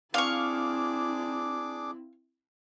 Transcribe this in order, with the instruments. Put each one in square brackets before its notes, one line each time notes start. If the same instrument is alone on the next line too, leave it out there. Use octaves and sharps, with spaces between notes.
[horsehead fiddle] C4 E4 [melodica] D4 G#4 D6 [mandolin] F5 C#6